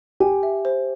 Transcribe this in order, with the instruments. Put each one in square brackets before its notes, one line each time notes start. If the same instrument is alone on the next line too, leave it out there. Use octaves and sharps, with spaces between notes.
[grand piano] G4 [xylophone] G#5
[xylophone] E5
C5